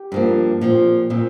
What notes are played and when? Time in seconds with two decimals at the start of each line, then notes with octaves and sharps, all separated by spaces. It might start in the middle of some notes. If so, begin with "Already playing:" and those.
Already playing: G4
0.12 G2 F3 A#3
0.61 A#2 F3 C4
1.10 A#2 F3 C4